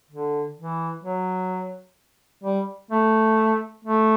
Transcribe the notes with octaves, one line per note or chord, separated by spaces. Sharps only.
D3
E3
F#3
G3
A3
A3